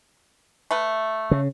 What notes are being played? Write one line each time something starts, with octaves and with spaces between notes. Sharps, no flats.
A3 B4
C#3